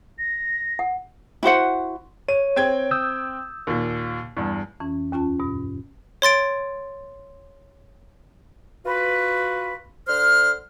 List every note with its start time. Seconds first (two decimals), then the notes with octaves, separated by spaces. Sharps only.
0.19 A#6
0.79 F#5
1.43 E4 F#4 C5 F#5
2.29 C#5 D#7
2.56 C4 G5 G#6
2.91 D#6 E6 G6
3.67 D#2 A#2
4.37 E2 G2
4.80 F2 E3 C#4
5.12 D#2 C#4 F4 A5
5.40 G2 B2
6.22 C#5 C6 A6 D7
8.86 F4 F#4 B4
10.07 D3 C5 F6